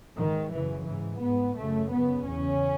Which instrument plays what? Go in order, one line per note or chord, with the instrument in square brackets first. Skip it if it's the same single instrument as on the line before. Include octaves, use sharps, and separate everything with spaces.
[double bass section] G#2 D#3
F#2 C#3 E3
G#2 E3
G#2 B3
F#2 C#3 A3
F#2 C#3 B3
E2 C#3 C#4